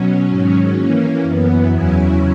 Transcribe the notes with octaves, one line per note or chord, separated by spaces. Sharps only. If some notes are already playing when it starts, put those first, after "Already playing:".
Already playing: B2 F#3 C#4
G#2 D#3 F#3 C#4
E3 A#3 C#4
F#2 E3 B3
E2 C#3 F#3 C#4 E4